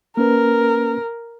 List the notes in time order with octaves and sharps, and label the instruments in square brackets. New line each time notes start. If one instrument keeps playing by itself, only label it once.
[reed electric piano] A#3 C#4 B4 [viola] A#4